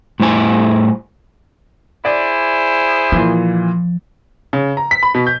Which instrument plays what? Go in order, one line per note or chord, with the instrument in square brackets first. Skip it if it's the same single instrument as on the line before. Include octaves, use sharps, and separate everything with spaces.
[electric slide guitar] A2 G3 E4 C5 G#5
[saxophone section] E4 G#4 C5 [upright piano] D5
[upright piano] A#2 E3 [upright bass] F3
[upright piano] C#3
A#5
B6
B5
B2
G6